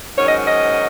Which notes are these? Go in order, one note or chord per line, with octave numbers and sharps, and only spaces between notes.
G#2 D#3 F#3 C#4 C#5
D#5
D#5